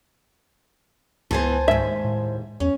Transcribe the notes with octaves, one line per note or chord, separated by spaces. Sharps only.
C#2 E3 B3 C5 G#5 A5
D#2 G#2 E5
A2
E2 C#4